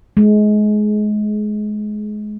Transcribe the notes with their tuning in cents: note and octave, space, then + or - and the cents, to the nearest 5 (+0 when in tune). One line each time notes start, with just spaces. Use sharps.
G#3 +25